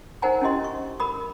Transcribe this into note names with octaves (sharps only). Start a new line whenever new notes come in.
D#4 A#4 C5 F#5 G#5 A#5
C#4 D4 E4 G4 D#5 C6
E4 C#6
A#4 B5 D#6